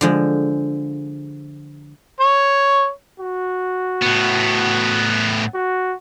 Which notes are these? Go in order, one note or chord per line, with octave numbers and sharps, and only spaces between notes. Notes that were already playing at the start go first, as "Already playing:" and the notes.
D3 F3 G#3
C#5
F#4
A2 B3
F#4